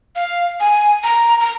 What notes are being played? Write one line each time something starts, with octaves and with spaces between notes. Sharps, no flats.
F5
G#5
A#5
A#5